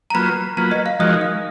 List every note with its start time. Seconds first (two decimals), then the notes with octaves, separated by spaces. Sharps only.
0.10 A#5
0.14 F#3 A#3 F4 B4 B5
0.57 F#3 A#3 F4 B4 A#5
0.71 D#5
0.86 F5
0.99 F3 G#3 D#4 F#4 A#4 D#5
1.21 F5